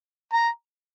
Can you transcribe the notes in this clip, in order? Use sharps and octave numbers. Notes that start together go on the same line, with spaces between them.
A#5